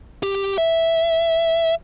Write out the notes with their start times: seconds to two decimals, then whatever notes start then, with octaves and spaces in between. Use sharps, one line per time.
0.23 G4
0.58 E5